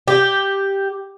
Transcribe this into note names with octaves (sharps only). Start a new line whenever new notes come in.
G4